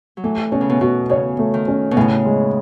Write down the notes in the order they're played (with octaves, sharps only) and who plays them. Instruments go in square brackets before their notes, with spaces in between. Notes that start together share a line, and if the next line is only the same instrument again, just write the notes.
[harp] F#3
[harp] E3 [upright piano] A3
[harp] B2 [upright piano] C#4
[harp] C#3
B2
[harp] B2 [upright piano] F#4
[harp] C#3 [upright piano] C#5
[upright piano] A3
[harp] D#3
[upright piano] C#4
[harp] B2
[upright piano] A2 [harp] C#3
[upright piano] G#3